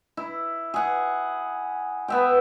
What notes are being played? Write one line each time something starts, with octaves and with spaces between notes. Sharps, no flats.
E4
G#4 F#5
B3 E5 G5